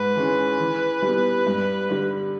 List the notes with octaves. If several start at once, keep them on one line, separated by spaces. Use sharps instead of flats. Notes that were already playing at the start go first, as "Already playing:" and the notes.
Already playing: G#2 B4
E3 G#3 C#4
E3
G3 B3
G2
D3 G3